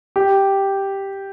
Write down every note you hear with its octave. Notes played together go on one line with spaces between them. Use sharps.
G4